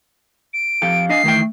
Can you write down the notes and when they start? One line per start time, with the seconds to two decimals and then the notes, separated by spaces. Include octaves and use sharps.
0.53 D7
0.82 F2 G4 A4 F5
1.09 D4 D#5 G#5 C7
1.24 D#3 E3 A3 G5